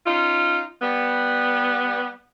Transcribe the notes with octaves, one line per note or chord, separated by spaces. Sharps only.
C#4 D#4 F4
G3 B3